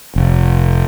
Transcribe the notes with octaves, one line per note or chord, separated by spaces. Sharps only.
F1